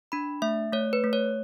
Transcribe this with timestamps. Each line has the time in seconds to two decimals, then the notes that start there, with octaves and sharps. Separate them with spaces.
0.12 D4 B5
0.42 A3 E5
0.73 A3 C#5
0.93 B4
1.04 A3
1.13 C#5